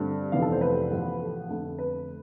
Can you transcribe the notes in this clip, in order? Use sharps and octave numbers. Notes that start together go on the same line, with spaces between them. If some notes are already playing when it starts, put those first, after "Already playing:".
Already playing: G2 D3 A3 C4
F1 F2 E3 B3 F5
A4
C5
B4
A1 A2 F3 B3
A4
F2 D3 A3
B4